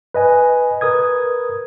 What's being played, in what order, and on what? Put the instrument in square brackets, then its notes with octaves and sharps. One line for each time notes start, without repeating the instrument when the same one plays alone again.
[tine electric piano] B4 D#5 G#5
A#4 B4 D#6 G#6